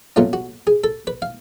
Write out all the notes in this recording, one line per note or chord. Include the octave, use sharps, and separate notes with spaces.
B2 F#3 A3 C#4 F4
F#4
G#4
A4
B4
F5